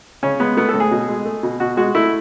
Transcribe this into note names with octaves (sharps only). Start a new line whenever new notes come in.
C#3 C#4
G#3 B3
A3 B3
A4
A2
G#4
B2
G#3
A3
B2
B2 F#4
G#3 F#4
A3 E4